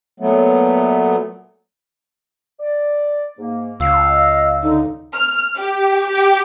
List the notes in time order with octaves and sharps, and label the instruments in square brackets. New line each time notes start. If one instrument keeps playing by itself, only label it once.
[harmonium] A#2 F#3 A3 B3
[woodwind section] D5
G#2 A#3
[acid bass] C#2 [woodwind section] F4 F5 [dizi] E6
[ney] D#5
[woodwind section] D3 [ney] D#4
[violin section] F6
G4
G4